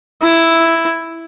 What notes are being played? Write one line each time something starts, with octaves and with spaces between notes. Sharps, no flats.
E4